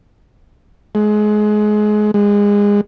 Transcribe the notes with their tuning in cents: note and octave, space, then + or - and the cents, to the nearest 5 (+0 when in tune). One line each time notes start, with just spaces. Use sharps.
G#3 +25
G#3 -25